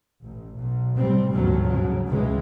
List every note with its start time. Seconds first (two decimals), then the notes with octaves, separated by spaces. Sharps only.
0.23 A1
0.56 B1
0.97 A2 C3 G3 C4
1.29 G#1 D2 G2 A#2 F3 F#3
1.68 C#3 F#3
2.09 C#2 C#3 E3 G#3